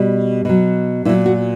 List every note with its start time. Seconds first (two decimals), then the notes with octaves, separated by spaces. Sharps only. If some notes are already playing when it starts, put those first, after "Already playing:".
Already playing: B2 G3
0.45 B2 F#3
1.05 A#2 E4
1.09 F#3
1.26 F#4